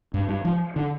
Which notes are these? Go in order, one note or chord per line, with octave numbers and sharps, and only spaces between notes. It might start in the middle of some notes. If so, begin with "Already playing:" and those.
G2
G2
F3
D3